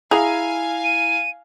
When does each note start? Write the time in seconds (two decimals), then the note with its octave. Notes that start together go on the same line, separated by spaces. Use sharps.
0.11 E4 G#4 F5 F#5 G#5 A#5 F7
0.84 D#7